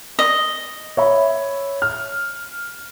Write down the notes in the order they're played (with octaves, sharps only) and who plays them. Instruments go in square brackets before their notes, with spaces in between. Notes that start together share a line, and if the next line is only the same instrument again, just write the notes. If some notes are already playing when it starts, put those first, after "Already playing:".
[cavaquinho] D#5
[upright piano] C#5 E5 B5
F6